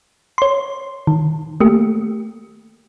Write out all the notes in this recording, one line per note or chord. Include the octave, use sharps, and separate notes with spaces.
C#5 C6
D#3
A3 A#3 G4